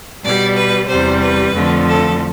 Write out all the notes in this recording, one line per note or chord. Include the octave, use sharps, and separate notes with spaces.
B2 G3 D5
B4
E2 C3 G3 C5
B4
F2 D3 F3 A3
A4